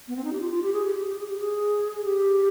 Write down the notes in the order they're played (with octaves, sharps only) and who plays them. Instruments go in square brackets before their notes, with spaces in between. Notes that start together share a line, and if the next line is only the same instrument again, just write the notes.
[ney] B3
C4
D#4
G4
F4
F4
G4
G#4
G4
G4
G4
G#4
G4
G#4
G4